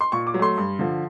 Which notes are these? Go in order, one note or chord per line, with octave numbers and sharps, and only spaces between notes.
C6
A#2 C#6
D6
F#3
A3 C6
G2
D3 F3